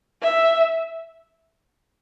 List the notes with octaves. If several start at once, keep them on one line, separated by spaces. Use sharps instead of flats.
E5